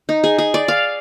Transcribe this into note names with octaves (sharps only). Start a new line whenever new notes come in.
D#4
G#4
G#4
D5
F5